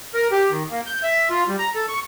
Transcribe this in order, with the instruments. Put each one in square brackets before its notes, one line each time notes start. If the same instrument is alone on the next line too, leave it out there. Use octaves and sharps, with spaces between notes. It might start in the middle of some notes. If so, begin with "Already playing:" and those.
[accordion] A#4
G4
D#3
A#3
G6
E5
F4
G3
A#5
A4
C#6